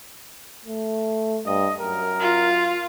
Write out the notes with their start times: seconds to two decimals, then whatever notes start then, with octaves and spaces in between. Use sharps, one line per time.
0.66 A3
1.46 G2 D#5
1.80 F#2 A#4
2.20 F4